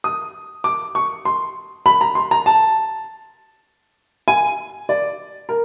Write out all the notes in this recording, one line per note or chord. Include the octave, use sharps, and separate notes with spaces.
D#6
D6
C#6
C6
B5
A#5
C6
A#5
A5
G#5
D5
A#4